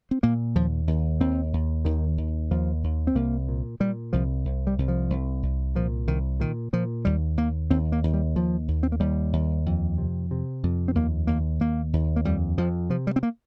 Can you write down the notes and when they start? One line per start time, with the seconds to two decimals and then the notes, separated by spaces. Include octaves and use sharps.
0.11 C4
0.23 A#2 A#3
0.55 D#2 F3
0.87 D#2
1.20 D#2 C4
1.53 D#2
1.85 D#2 D#3
2.18 D#2
2.51 D#2 F3
2.84 D#2
3.07 C4
3.15 C2 A#3
3.48 A#2
3.80 A#2 G3
4.13 C2 F3
4.45 C2
4.67 G3
4.78 C2
4.88 F3
5.10 C2
5.43 C2
5.75 A#2 F3
6.07 C2 D#3
6.40 A#2 D#3
6.73 A#2 F3
7.05 D#2 G3
7.37 D#2 A#3
7.70 D#2 C4
7.92 A#3
8.03 D#2
8.14 G3
8.36 D#2 F3
8.68 D#2
8.83 C4
8.92 A#3
9.00 D#2 G3
9.33 D#2
9.66 F2
9.98 C3
10.31 C3
10.63 F2
10.88 C4
10.95 D#2 A#3
11.27 D#2 A#3
11.60 D#2 A#3
11.93 D#2
12.16 A#3
12.25 F2 G3
12.58 F2 F3
12.90 C3 F3
13.07 G3
13.16 C4
13.23 A#3